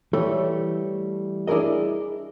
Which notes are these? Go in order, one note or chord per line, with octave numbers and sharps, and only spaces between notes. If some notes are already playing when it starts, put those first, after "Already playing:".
E3 G3 A3 A4 C#5
D4 E4 G#4 A#4 D#5